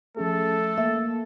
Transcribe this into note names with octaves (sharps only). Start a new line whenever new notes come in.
F3 A3 C#4 G#4 A4
A#3 E5